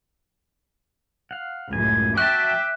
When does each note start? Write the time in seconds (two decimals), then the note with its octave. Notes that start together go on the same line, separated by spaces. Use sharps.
1.31 F5 F#5
1.73 C#2 F#2 A2 G#5
2.18 F#4 E5 G5 A5 D6 F#6